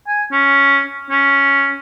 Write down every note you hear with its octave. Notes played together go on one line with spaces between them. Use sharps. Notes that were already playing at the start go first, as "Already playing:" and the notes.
G#5
C#4
C#4